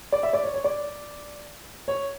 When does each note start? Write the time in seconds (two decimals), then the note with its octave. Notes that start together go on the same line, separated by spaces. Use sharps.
0.12 D5
0.23 E5
0.33 D5
0.44 C#5
0.54 C#5
0.64 D5
1.88 C#5